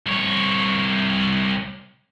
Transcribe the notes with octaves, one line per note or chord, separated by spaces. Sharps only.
C2 C#5